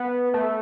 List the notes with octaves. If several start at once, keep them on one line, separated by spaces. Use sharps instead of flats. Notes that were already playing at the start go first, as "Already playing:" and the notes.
Already playing: B3
A3